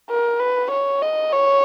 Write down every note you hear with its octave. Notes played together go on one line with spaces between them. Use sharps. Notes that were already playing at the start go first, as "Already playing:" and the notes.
A#4
B4
C#5
D#5
C#5